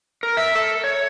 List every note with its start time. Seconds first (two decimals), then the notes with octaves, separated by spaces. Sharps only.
0.23 A#4
0.37 E5
0.55 A4
0.84 C#5